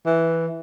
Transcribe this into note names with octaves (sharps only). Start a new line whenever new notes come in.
E3